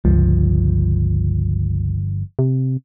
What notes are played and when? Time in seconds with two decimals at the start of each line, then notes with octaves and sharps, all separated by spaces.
0.05 G1 C#2 F3
2.39 C3